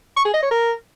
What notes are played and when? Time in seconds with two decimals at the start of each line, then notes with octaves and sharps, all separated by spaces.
0.17 C#6
0.25 G#4
0.34 D#5
0.42 C#5
0.51 A#4